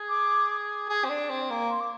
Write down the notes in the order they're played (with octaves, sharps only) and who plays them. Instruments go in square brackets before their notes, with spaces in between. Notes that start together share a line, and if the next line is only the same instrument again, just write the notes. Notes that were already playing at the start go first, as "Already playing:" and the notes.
Already playing: [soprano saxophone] G#4
[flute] D6
[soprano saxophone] G#4
C4
D4
C4
A#3
[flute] C6
D6